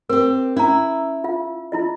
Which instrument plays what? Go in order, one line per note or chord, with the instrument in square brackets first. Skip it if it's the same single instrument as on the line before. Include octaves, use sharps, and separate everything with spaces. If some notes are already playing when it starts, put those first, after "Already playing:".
[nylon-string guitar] C4 G4 [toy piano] A#4
[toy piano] C#4 A#5 [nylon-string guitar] E4
[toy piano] F4 F5
E4 F4 D#5